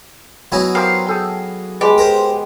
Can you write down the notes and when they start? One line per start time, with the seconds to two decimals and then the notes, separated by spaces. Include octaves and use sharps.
0.52 F#3 B3 D#4 E4 G#5
0.75 G4 A#4 C5 F5
1.07 G#4 A4 G5
1.81 G#3 G4 B4
1.98 A#4 C5